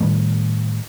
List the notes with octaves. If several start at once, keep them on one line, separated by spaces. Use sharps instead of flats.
A2 D#3 G3 A3